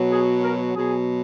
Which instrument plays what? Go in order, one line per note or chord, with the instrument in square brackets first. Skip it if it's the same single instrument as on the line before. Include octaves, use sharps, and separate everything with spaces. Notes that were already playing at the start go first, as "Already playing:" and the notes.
Already playing: [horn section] B2 F#3
G#4
A#4
B2 F#3 G#4